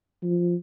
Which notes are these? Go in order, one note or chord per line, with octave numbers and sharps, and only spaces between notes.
F3